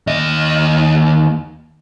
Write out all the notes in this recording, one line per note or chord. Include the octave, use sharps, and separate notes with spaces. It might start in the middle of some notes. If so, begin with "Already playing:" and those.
D#2 D#5